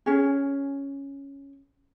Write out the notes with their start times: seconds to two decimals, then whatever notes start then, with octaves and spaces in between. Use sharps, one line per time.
0.06 C#4 G#4